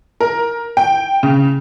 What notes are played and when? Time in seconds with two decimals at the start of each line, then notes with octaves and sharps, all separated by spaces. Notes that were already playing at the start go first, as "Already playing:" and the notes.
0.20 A#4
0.77 G5
1.23 C#3